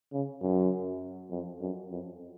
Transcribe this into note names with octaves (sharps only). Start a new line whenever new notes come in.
C#3
F#2
F2
F#2
F2